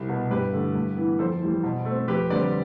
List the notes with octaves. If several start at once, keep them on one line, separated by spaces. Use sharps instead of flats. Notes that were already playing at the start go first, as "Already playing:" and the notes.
Already playing: C2
B2 B3
G2 G4 B4
D3 A3
G2
E3 B3
F2 A4 C5
E3 G3
B2
A3 C4
F2 G4 B4
D3 G3 C4 B4 D5